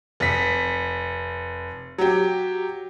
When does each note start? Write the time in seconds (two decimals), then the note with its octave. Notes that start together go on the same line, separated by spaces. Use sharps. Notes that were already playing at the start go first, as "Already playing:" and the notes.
0.20 F1 B6
1.98 F#3 G4